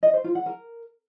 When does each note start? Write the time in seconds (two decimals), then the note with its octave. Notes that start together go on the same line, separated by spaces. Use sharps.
0.03 D#5
0.14 C5
0.24 F4
0.35 F#5
0.46 A#4